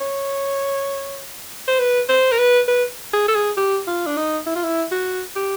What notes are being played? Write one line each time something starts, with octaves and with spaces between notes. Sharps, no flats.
C#5
C5
B4
C5
A#4
B4
B4
G#4
A4
G#4
G4
F4
D4
D#4
E4
F4
E4
F#4
G4